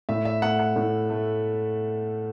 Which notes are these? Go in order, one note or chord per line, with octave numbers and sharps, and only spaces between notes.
A2 E5
E5
A3 F#5
F#5
A2
A3